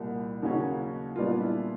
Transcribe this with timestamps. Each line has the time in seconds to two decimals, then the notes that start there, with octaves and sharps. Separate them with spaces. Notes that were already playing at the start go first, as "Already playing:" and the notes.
Already playing: C2 A#2 G3
0.42 D#2 C#3 F#3 A#3 C#4
1.16 A#2 G3 B3 D4 F4
1.41 E4